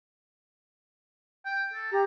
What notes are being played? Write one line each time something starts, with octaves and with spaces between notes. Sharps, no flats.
G5
A4
G4 A#5